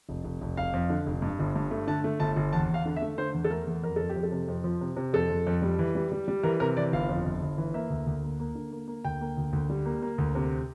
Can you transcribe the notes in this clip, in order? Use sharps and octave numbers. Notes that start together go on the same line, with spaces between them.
F1
F1
F1
F1 F5
F2
D3
F1
G2
G1
G2
A3
D3 A5
A3
G1 A5
G1
E2 A5
E2
F5
D3
E5
A3
D3 C5
E2
A4
A3 A#4
E2
F2 A#4
F2 A4
G4
F2
A4
C3
F2
F3
C3
C3
F2 A4
F2
F2
G3
E3
G3
G3
G3
E3 A#4
C3 A#4
E3 D5
G1 F5
F2
G1
G1
E3
A#3 E5
D2
D2
A#3
A#3
D3
A#3
A#3
D2 G5
A#3
D2
D2
G3
A#3
A#3
D2
C3